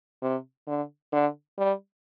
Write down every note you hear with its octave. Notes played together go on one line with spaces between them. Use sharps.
C3
D3
D3
G3